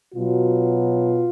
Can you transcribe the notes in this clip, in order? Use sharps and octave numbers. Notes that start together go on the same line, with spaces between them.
B2 F#3 F4